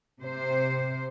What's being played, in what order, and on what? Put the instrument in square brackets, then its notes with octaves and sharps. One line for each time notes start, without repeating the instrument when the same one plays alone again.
[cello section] C3 C5